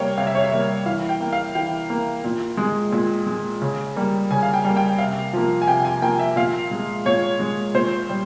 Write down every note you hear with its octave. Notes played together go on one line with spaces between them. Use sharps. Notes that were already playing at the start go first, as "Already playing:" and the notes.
Already playing: C3 G3 A#3 C#5 F5 G5
C3 F5
E5
C#5
E5
G3 A#3
E3 F5
G5
A#3
F5
E3 G5
A#3
A#2
G#3
A#2
G#3
C#3
G3 A#3
C#3 G#5
F5
G5
G3 A#3
G5
C3 F5
F3 A#3
G#5
C3 G5
G#5
F3 A#3 G5
E5
A#2 F5
G#3
A#2 C#5
G#3
A#2 C5
G3